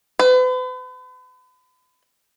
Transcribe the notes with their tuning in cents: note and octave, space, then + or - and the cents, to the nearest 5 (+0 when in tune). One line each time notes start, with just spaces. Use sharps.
B4 +40